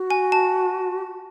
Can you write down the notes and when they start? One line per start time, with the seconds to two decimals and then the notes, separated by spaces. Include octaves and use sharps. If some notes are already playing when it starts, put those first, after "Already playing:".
Already playing: F#4
0.10 G#5
0.32 A5